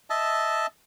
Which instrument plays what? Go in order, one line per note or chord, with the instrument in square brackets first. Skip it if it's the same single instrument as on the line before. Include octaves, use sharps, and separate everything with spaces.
[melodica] D#5 E5 A5